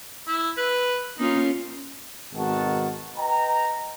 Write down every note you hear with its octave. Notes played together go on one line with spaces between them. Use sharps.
E4
B4
A#3 C#4 D#4 F4
G#1 B2 D#3 F#4 A5
B4 D#5 G5 A#5